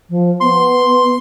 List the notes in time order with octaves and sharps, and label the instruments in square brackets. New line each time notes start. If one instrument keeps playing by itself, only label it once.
[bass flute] F3
[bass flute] B3 [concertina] C6